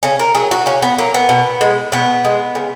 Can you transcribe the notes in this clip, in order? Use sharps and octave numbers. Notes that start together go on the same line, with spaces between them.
C#3 C#4
A#4
F#3 G#4
F#4
C#3 C#4
B3
F#3 A#3
B3
B2
G#3
B2 B3
G#3
C#3